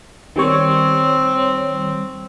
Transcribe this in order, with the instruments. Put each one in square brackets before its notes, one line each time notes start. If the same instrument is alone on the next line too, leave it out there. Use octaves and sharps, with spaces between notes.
[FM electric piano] D#3 G3 C#5 [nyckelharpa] C4